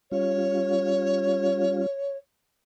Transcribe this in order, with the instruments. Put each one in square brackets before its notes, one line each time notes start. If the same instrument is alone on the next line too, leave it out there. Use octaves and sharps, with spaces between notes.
[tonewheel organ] G3 C#4 F4 [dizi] C#5